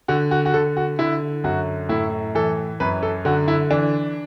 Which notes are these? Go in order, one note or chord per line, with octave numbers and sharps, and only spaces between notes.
D3 F#4
F#4
F#4
D3 A4
F#4
D3 E4
F#2 F#4
A2 E4
E3 A4
F#2 B4
A4
D3 F#4
E4
E3 D4